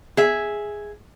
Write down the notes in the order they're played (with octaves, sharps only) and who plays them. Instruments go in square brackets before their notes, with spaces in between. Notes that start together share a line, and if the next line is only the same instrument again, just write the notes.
[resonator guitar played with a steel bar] G#4 E5